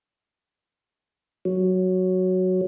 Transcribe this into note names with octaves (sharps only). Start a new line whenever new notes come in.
F#3